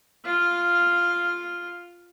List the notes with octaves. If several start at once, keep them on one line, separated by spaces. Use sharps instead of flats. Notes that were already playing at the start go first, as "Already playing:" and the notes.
F4 F5